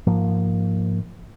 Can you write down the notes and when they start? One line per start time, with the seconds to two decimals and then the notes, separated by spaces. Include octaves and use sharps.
0.07 G#2 F3 A#3